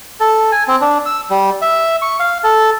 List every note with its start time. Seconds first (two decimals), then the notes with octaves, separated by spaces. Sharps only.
0.20 A4
0.52 G#5
0.68 C4
0.81 D4
1.06 E6
1.30 G3
1.62 E5
2.02 C#6
2.20 F5
2.44 A4